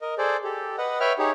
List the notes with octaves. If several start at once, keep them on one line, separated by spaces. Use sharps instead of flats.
A#4 D#5
G#4 A4 C5 D5
G4 A4
B4 D#5 F#5
B4 C#5 E5 G5 F6
D#4 G4 G#4 C#5